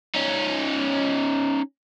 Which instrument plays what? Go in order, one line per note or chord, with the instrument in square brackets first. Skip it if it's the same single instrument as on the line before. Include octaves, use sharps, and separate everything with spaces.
[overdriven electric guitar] C#4 D#4